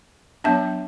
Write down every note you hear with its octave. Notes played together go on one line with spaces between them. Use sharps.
F#3 B3 D4 E5 A5